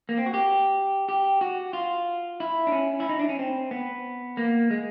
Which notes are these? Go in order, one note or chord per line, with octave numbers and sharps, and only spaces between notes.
A#3
C4
F#4
G4
G4
F#4
F4
E4
D4
C#4
E4
D#4
D4
C#4
C4
B3
A#3
G#3